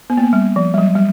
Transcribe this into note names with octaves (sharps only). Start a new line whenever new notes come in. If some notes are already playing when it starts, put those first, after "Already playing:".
B3
A#3
B3
G3
F3
G3
F#3
G3